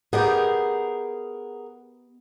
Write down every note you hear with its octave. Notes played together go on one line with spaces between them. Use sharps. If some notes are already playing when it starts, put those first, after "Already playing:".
B3 D#4 G4 G#4 A#4 F#5